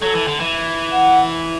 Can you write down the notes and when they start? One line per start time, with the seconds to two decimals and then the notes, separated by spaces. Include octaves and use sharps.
0.01 F#3 A4
0.15 E3
0.28 D3
0.40 E3
0.92 F#5